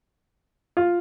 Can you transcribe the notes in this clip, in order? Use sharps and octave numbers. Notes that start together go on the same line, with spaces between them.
F4